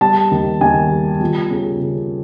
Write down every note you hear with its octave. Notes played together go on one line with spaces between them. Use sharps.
G3 A5
D#2
D#2 G#5
G3
F3
C#3
C#3